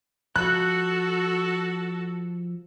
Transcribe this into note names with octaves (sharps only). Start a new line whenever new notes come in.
F3 F#4 A4 F#6